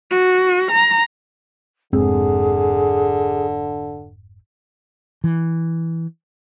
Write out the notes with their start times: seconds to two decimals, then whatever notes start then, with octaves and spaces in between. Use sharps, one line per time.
0.11 F#4
0.71 A#5
1.93 F1 G#2 D3 C4 G#4
5.24 E3